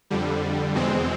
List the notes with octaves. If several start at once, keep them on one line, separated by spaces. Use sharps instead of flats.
F2 D3 G3
E2 B2 G#3 C4